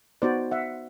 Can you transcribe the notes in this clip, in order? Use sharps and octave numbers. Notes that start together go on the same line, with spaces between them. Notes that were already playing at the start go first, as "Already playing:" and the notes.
B3 D#4 F#4 C5 D5
E5 F#5